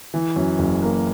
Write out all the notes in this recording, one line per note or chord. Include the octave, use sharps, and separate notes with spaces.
E3
F#2
F#1
A#3